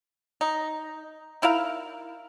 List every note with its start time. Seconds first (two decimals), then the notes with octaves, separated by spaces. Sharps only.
0.41 D#4
1.42 D#4 E4 A#4 F5